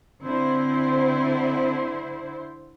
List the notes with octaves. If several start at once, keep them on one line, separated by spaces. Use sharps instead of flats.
D3 C4 E4 C5